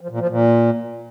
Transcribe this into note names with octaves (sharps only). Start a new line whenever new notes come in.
F3
A#2
F3
A#2